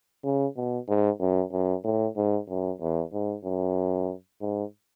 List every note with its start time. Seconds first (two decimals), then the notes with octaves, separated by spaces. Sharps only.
0.24 C#3
0.56 B2
0.88 G#2
1.20 F#2
1.52 F#2
1.84 A2
2.17 G#2
2.49 F#2
2.81 E2
3.13 G#2
3.45 F#2
4.41 G#2